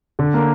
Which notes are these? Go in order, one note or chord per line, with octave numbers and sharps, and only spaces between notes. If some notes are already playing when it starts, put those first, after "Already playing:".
D3
A#3